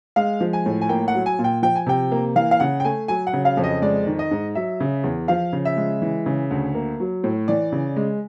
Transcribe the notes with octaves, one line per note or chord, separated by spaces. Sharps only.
G#3 F5
F3
G#5
A2
G#5
A#3 G5
F#5
F#3
G#5
A#2
G5
F3 G5
G#5
C3 G5
A#3
E3 F5
F5
C#3 F#5
G5
A3 G#5
F#3 G#5
F#5
C#3
F5
F2
D#5
G#3 D5
D#3
D#5
G#2
F#3 E5
C#3
E2
F3 F5
C#3
E5
G#3
E3
C#3
D2
A#3
F#3
A2
E3 D5
C#3
G#3